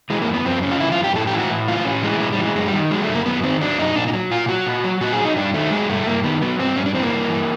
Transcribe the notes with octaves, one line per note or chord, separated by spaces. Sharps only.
E3 G#3
A#3
F#2
B3
F#2 C4
C#3 C#4
F4
E3 E4
F4
F#2
G4
A2 A4
G4
E3
F#4
A2
E3 F4
A2 C#4
E3 G#3
A2 G#3
G3
E3
G#3
F#2 G#3
G3
D#3
F#3 G#3
A3
F#2
A#3
F#2 B3
D#3 C4
F#3 D4
F#2 D#4
A#2 D4
D#4
F#3
A#2 F4
F#3 F#4
A#2
F#3
A#2 F#4
G#4
F#3
D#4
G2 D4
D#3 A3
F#3 G#3
G2 A3
G2 A#3
D#3 B3
F#3 B3
G2 C4
G2 C#4
D4
E3 C4
A#3
G2
E3